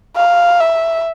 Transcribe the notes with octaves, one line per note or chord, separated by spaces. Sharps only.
F5
E5